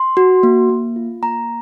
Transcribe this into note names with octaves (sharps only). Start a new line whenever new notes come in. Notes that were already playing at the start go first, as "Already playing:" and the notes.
Already playing: C6
F#4
A#3
A#3
F4
A#3 A#5